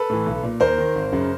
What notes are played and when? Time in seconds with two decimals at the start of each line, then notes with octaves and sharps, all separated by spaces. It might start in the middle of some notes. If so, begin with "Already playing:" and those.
Already playing: A4 B4
0.10 A2 E3
0.26 B1
0.43 A#2
0.60 D#2 A#4 C5
0.78 D#3
0.95 G#1
1.12 F#2 C#3